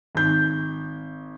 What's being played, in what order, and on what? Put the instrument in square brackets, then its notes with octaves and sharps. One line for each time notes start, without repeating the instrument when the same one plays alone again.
[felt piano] G#1 G6